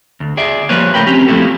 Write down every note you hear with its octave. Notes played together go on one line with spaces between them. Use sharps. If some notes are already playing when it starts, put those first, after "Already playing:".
D2
G#4 D5 E5
F3 G3 A#3 B4 C#5
C#2 C3 A3 A#4 G5 B5
C4 C#4 G4
F3 A3 A#3 E4 G4 A4